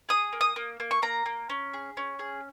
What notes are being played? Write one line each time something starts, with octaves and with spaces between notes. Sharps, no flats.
G#4 D#6
A#3
D#6
A#3
A#3
C#6
A#3 A#5
A#3
C#4
G#4
C#4
G#4